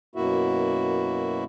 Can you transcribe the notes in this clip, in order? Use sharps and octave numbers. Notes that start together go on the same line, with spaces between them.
F#2 B2 A#3 E4 F#4 E5